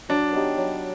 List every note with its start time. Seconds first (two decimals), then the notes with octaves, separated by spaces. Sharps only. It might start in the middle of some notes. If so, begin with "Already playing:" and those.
0.09 F#3 D4
0.33 B3 D#4 G4
0.57 F#3